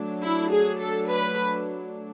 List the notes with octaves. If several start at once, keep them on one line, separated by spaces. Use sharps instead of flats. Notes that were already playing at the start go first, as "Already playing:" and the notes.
Already playing: F#3 A3 D4
E4
G#4
A4
B4